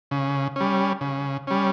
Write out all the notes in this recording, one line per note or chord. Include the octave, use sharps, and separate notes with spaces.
C#3
G3 C#4
C#3
G3 C#4